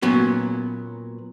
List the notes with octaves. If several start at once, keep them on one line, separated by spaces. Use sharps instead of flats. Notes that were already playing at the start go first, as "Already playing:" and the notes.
A#2 F#3 B3 C#4